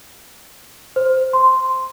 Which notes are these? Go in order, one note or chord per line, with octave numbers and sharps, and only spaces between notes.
C5
C6